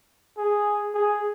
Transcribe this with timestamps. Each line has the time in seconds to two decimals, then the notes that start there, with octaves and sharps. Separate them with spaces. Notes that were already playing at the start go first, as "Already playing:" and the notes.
0.38 G#4
0.94 G#4